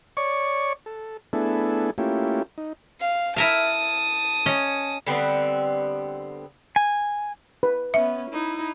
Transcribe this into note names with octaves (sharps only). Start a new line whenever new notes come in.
C#5 D5 C#6
A4
A3 B3 D4 E4 G#4 A4
A3 A#3 C#4 E4 F4 G4
D#4
F5
E4 A#4 F5 A5 D#6
C#4 D#5
D3 G3 B3 C4
G#5
B4
B3 C#4 E5
D#4 E4